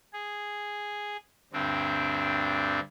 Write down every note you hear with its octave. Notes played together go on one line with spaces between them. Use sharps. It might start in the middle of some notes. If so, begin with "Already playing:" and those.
G#4
D2 G2 C4 D4